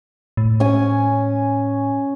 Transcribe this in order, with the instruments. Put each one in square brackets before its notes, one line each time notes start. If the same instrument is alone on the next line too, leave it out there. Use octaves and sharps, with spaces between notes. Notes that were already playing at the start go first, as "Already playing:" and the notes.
[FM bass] A2
[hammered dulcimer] C#4 G#5